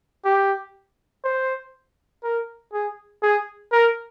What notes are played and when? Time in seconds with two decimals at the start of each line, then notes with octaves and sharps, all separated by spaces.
0.25 G4
1.24 C5
2.24 A#4
2.73 G#4
3.23 G#4
3.72 A#4